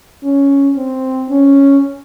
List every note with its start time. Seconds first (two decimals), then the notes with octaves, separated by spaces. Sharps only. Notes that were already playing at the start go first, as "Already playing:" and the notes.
0.23 C#4
0.76 C4
1.29 C#4